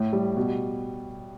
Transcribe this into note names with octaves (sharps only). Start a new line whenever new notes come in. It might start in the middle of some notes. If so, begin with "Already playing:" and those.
Already playing: A2
G3
B2